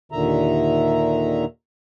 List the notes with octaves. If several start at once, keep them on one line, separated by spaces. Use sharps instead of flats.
D#2 A#2 D3 D#3 E5 A#5